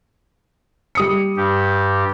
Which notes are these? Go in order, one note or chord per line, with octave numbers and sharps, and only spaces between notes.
G3 D#6 C#7
G2 G4